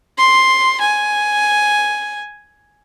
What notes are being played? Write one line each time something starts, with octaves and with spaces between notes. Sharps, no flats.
C6
G#5